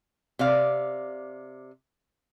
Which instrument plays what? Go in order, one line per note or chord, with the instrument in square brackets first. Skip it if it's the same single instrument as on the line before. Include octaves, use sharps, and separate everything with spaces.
[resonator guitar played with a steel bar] C3 D5 F5